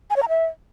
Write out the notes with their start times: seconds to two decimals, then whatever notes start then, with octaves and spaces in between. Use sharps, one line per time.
0.10 G#5
0.16 C#5
0.23 A#5
0.29 E5